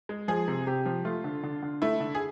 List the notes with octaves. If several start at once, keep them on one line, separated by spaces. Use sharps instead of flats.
G#3
F3 G#4
C3
C3 G4
F3
A3 F4
D3
D3
D3
A3 E4
D3
G#4